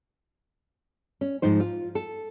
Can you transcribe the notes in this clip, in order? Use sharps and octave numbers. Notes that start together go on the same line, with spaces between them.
C#4
G#2 F3 D#4 C5
F4
A4